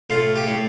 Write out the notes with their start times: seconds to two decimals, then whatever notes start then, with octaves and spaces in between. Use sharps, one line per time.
0.10 A2 F4
0.36 G4
0.47 A2